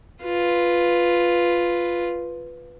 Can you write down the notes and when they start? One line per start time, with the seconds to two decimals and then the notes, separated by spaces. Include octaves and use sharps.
0.23 F4 B4